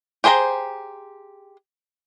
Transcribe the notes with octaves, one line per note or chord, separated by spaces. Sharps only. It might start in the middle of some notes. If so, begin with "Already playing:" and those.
G4 G#4 C5 G5 A#5